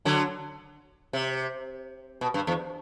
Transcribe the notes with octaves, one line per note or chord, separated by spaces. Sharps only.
D3 F#3
C3
B2
G2
E2